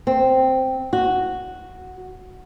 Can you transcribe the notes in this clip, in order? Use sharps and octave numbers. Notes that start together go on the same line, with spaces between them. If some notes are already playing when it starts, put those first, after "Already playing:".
C4
F#4